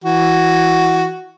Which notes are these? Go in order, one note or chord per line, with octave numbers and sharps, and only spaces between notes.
E3 F#4